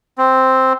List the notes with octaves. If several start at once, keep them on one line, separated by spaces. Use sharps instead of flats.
C4